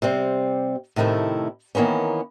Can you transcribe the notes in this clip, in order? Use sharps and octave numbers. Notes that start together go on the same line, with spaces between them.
C3 G3 C4
A2 C3 D#3 A3 E4
D#3 E3 A#3 B3 C#4